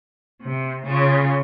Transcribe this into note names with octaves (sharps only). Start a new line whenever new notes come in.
C3
C#3 C#4 F4